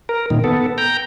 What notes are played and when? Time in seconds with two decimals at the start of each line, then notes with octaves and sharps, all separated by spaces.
0.09 A#4
0.30 A#2 D#3
0.44 B3 A4
0.78 G5 A#5